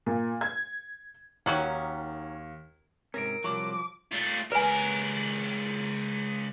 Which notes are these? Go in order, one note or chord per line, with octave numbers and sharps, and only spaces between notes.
A#2
G#6
D#2 D#3 F#3 C#4
G#2 C3 C#4 A#4 A#6 D7
C2 F3 F#3 D6
A3 F4
C#2 A#4 B4 G#5